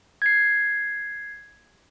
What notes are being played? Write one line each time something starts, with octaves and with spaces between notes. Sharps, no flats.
G#6 C7